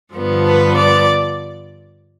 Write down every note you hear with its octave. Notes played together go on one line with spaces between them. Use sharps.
G2 D3 F3 B3
B4
D5